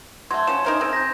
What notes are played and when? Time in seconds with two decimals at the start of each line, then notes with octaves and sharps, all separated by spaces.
0.31 F#3 A3 C6 G#6
0.47 F3 C#4 E7
0.65 D#4 A#4 C5
0.79 C4 G#4
0.93 G6 A#6